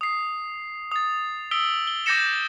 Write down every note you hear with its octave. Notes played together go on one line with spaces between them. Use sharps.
D#6 C7
D#6 A6
D#6 E6 B6 D7 G7
G7
D6 G6 A6 A#6 C#7 E7